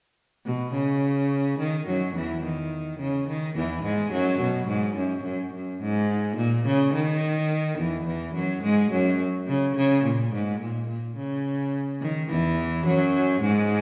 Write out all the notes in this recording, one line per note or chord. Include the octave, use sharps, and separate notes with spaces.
B2
C#3
D#3
F#2 F#3
E2 E3
D#3
C#3
D#3
E2 E3
G#2 G#3
F#2 F#3
B2
G#2
F#2
F#2
F#2
G#2
A#2
C#3
D#3
E2 E3
E2 E3
F#2 F#3
G#2 G#3
F#2 F#3
C#3
C#3
A#2
G#2
A#2
A#2
C#3
D#3
E2 E3
F#2 F#3
G#2 G#3